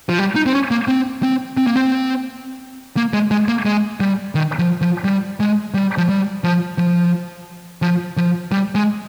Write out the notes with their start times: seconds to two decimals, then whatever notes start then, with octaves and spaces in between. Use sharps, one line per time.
0.09 F3
0.19 G3
0.36 D#4
0.46 C4
0.53 C#4
0.71 A#3
0.88 C4
1.23 C4
1.57 C4
1.67 A#3
1.76 C4
2.97 A#3
3.13 G#3
3.31 G#3
3.48 A#3
3.66 G#3
4.00 G3
4.35 D#3
4.59 F3
4.81 F3
5.04 G3
5.40 G#3
5.74 G3
5.98 F3
6.09 G3
6.44 F3
6.78 F3
7.82 F3
8.17 F3
8.52 G3
8.75 G#3